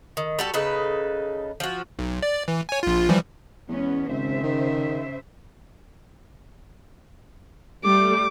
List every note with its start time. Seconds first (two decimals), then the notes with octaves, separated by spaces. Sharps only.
0.17 D#3
0.39 G3 F#4 A4
0.54 C#3 D#4 A4 B4
1.60 F3 F#4
1.99 B1
2.22 D5
2.48 E3
2.69 C#5 G#5
2.83 A#1 F4
3.09 E3 F3 G3
3.69 E2 G#3 B3 C#4
4.09 G#1 C#3 C5 E5
4.43 D#3
7.84 G3 A3 D6